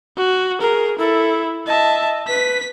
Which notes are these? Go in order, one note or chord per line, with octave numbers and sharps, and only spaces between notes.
F#4
G#4 A#4
E4 A4
D#5 E5 A5
B4 B6